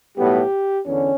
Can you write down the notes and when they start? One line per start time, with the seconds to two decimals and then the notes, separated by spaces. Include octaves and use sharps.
0.16 B1 A2 G3 B3 G4
0.86 E2 D3 C#4